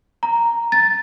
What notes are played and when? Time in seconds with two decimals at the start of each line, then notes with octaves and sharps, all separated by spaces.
0.23 A#5
0.72 A6